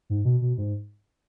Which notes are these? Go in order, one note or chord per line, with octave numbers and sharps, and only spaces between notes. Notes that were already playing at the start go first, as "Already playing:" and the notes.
G#2
B2
B2
G#2